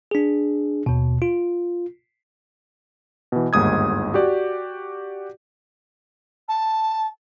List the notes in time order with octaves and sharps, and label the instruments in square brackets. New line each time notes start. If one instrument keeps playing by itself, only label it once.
[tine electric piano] D4 G#4
D#2 B2
F4
[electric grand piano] B2 E3
G1 D#2 G#2 D#6 G#6
F#4 G4 D5
[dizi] A5